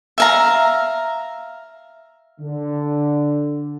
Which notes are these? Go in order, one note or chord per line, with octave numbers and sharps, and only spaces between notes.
E5 F5 A#5
D3